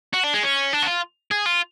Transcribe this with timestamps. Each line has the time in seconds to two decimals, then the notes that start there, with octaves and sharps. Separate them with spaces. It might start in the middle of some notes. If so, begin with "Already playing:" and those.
0.14 F#4
0.24 D4
0.34 G#3
0.43 C#4
0.73 D4
0.82 F#4
0.87 F4
1.31 G#4
1.46 F4